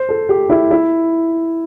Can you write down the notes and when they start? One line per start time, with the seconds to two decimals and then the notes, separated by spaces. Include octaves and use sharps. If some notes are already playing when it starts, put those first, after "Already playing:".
Already playing: C5
0.09 A4
0.29 G4
0.50 E4
0.71 E4